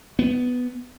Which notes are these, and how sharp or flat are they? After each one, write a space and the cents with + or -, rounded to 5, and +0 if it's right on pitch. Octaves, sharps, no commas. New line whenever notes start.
B3 +5